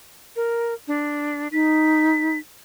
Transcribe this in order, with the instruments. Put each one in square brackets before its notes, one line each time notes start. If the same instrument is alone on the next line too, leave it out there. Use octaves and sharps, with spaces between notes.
[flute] A#4
D4
[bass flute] D#4 [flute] B6